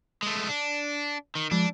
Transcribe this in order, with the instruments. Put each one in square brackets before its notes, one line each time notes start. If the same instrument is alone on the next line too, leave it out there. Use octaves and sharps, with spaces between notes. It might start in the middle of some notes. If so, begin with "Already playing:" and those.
[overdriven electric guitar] G#3 A3
D4
D#3
[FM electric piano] F3 G#3 [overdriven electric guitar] D4